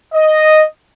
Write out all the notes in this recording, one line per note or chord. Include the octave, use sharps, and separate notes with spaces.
D#5